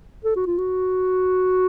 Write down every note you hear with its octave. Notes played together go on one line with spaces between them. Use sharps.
A4
F#4
F4
F#4